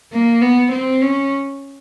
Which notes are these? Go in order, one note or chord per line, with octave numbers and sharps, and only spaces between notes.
A#3
B3
C4
C#4